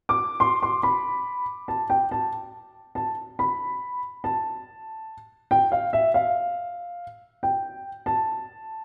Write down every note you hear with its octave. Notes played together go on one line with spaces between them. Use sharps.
D6
C6
C6
B5
A5
G5
A5
A5
B5
A5
G5
F5
E5
F5
G5
A5